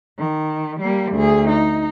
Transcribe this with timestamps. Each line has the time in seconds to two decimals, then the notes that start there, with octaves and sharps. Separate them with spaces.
0.19 D#3
0.81 G3 A#3
1.12 D2 G#4
1.49 D#4